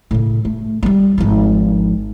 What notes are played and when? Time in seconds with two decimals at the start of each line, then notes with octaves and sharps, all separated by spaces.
0.11 A2 C#3
0.45 A3
0.83 G3 A3
1.18 G#1 F3